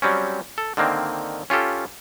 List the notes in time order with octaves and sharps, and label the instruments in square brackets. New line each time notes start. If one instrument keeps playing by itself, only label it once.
[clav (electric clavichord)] F#3 G3 C4 C#4
A4
D3 D#3 A#3 C4
C#4 F4 G4 A4